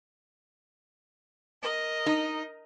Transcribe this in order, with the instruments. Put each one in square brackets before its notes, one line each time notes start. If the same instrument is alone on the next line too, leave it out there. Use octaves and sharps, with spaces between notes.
[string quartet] A#4 D#5
[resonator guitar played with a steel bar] D#4